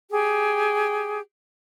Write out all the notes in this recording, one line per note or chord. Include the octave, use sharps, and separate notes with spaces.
G4 G#4